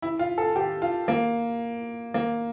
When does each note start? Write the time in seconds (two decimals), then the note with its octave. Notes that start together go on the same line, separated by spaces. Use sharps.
0.02 E4
0.19 F4
0.38 A4
0.56 G4
0.82 F4
1.08 A#3
2.14 A#3